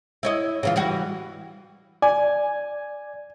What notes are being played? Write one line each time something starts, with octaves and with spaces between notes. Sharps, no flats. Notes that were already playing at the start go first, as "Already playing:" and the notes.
E4 C#5 D#5
C#3 E3 F4
E3 G3 F#4
D5 G#5